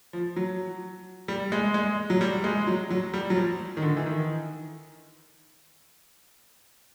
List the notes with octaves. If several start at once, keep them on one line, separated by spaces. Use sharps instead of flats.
F3
F#3
G3
G#3
G#3
F#3
G3
G#3
F#3
F#3
G3
F#3
F3
D#3
D3
E3
D#3